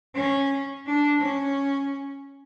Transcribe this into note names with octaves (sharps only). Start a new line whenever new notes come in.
C#4
D4
C#4